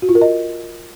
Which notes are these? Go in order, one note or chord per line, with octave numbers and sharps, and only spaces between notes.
F#4
F4
A#4
D#5